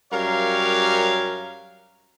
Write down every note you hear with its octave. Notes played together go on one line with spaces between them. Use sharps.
F#2 G3 A#4 C#5 F5